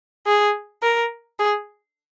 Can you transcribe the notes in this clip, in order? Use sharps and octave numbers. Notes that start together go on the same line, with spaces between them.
G#4
A#4
G#4